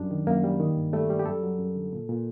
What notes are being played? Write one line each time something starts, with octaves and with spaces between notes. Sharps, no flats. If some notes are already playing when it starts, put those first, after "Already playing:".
Already playing: F#2 G3 D4
D#3
F#2 A#3
G3
D#3
G2
G3 A3
G3
G4
F#2 A4
F#3
F#2
D3
A#2
A#2